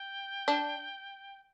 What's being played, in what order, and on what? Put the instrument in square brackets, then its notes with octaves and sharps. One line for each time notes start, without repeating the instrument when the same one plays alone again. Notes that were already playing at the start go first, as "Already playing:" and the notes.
Already playing: [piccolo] G5
[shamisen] D4